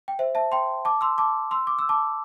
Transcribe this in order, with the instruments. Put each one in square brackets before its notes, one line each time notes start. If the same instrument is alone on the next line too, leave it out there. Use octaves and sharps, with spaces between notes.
[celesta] G5
C5 E5
E5 A5
G5 C6
A5 D6
C6 E6
A5 D6
C6 E6
D6
E6
A5 D6